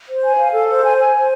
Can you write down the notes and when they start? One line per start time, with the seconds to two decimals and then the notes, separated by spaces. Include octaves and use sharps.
0.09 C5
0.23 G#5
0.38 F5
0.53 A4
0.68 C5
0.84 G#5
0.98 G#5
1.13 C5